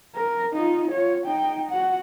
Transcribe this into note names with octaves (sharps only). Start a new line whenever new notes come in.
A#4
D#4 F4
F4 C#5
D#4 G5
F#4 F#5